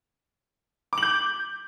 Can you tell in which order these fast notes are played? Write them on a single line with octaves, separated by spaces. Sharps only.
D6 F#7 G6